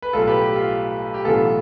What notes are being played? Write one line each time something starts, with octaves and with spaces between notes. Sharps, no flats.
B4
B1 A2 G3 F4 A4
G4 B4
G4
F4
G4
B1 A2 E3 B3 D4 F4 A4